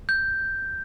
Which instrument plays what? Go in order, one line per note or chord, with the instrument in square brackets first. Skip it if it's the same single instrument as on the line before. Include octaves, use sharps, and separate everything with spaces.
[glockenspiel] G6